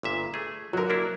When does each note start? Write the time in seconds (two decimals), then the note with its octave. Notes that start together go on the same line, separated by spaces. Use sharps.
0.03 G1 A#2 E5
0.34 A3 G#4
0.73 B1 D3 F#3 A#4
0.90 A#3 D4 E4